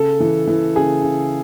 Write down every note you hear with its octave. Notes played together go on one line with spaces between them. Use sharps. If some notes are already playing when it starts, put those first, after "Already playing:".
Already playing: C#3 A4
E3
E3
C#3 G#4
C#3